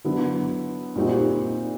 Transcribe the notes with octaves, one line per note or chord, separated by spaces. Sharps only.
D3 F#3 B3 E4
A#2 G3 C4 D#4 F#4